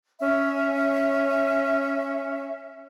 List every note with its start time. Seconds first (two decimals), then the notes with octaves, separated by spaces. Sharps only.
0.21 C#4 E5